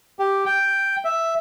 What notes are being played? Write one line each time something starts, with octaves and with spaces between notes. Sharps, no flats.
G4
G5
E5